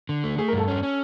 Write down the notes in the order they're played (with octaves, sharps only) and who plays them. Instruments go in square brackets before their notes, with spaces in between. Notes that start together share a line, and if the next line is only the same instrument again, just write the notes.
[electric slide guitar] D3
A3
[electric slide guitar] A3 [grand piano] G#4
[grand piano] A#4
[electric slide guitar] G2 [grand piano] A4
[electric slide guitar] C#4
C#4